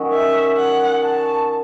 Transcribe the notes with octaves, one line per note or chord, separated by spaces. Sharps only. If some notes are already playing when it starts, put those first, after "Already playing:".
Already playing: D#3 F#3 C#4 F#4
E5
F#5
A5